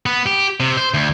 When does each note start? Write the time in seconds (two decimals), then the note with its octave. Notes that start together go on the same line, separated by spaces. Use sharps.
0.06 B3
0.26 G4
0.60 C3
0.77 C5
0.94 D2